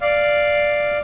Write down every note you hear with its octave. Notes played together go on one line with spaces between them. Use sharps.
D5 F5